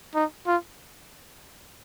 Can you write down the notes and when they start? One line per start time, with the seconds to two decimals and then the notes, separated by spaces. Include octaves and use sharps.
0.15 D#4
0.47 F4